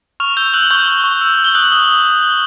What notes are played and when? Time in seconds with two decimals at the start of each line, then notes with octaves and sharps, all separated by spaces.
0.20 C#6 F6 F7
0.37 E6 G6 G7
0.54 E6 F#6 F#7
0.71 C#6 G6 G7
0.88 C#6
1.04 C#6
1.21 E6
1.38 E6
1.44 G7
1.55 D#6 F#6 F#7
1.72 D#6